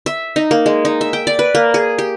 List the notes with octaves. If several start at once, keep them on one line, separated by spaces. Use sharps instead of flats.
E5
D#4
A#3
G#3
D#4
E5
G5
D5
B4
A#3
G#4
G4